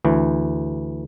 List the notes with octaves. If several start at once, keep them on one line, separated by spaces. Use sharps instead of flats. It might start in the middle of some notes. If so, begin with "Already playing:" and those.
D2 E3